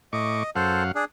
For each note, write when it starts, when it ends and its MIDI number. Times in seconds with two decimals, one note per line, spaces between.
0.13 0.43 45
0.13 0.50 75
0.13 0.43 85
0.13 0.43 86
0.56 0.92 42
0.56 0.83 69
0.56 0.83 72
0.56 0.92 77
0.56 0.92 78
0.95 1.05 62
0.95 1.05 68